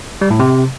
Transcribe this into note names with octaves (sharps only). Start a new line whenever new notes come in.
G3
A2
C3